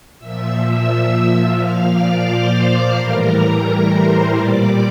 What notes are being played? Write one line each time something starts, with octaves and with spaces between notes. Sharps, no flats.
A#2 F3 E5 E6
E5 E6
A#2 F3 F5 F6
D5 D6
C5 C6
A2 E3 G3 A#4 A#5
C5 C6
A#2 G3 D5 D6